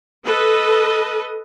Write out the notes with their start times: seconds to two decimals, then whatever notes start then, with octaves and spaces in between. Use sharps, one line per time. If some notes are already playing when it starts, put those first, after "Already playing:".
0.24 A4 B4 D#5